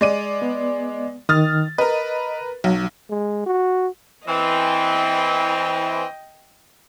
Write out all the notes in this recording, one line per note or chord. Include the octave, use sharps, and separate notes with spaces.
G#3 D5 D#7
B3
D#3 D#6 F6 A6
A#4 B4 D#5
B1 F#3
G#3
F#4
E3 C4 D#5 G5